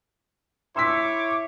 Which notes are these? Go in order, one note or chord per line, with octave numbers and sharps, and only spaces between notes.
E4 C#5 C6 D6 E6 B6